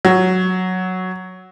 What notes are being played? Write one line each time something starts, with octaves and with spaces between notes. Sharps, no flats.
F#3